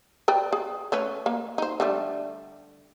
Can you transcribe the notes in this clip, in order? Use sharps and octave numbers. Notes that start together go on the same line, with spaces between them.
B4 D5 G5
G#4
A3 C#4 B4
A#3
D#4 C5
D3 G3 A3